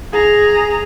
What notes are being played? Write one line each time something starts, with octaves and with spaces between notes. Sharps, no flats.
G#4 A#5